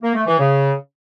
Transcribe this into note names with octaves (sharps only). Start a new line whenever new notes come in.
A#3
A3
E3
C#3